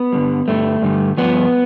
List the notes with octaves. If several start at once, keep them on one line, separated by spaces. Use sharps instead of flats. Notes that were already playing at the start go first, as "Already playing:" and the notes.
Already playing: B3
G2 D3 G3
G2 D3 G3 A3
G2 D3 G3
G2 F3 B3